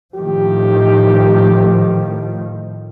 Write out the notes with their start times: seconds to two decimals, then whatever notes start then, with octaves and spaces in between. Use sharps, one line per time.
0.15 A2 D#3 F3 G4